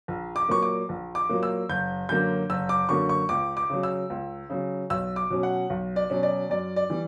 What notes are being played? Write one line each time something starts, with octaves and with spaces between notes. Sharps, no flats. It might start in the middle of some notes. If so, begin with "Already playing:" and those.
A#1
D6
A#2 F#3 A#3 C#6
D6
A#1
D6
A#2 F#3 A#3
E6
F#1 G6
F#2 D3 F#3 A#3 G6
F#1 E6
D6
F#2 D3 F#3 A#3 C#6
C#6
C#2 D6
D6
C#3 F#3
E6
C#2
C#3 F#3
B1 E6
D6
B2 F#3 C#4
F#5
B1
D5
B2 F#3 C#4
D5
F#2 D5
D5
E3 G3